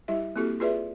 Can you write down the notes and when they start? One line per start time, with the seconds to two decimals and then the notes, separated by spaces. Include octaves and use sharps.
0.08 G3 E4 G4 E5
0.36 A#3 C4 E4 F#4 G4 A4
0.60 F4 G#4 B4 D5 E5